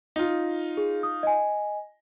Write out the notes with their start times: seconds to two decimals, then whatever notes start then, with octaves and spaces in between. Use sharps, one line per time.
0.16 D#4 F4
0.77 G#4
1.03 D#6
1.23 D#5 G#5